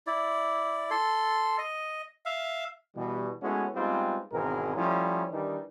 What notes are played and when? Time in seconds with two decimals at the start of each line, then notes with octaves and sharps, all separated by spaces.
0.07 E4 D5
0.90 A4 C6
1.58 D#5
2.26 E5 F5
2.96 B2 E3 G3
3.42 G#3 A3 B3 C#4 E4 F#4
3.75 G3 G#3 B3 C4 D#4 F4
4.33 G#1 B2 E3 G#3 C4 A#4
4.76 F3 G3 A3 C#4 E4
5.31 D#3 E3 G3 D4 D#4